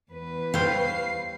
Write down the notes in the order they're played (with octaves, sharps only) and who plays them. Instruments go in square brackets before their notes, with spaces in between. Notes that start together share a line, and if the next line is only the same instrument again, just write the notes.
[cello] E2 B4
[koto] G3 C5 C#5 [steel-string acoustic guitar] F5 [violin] C7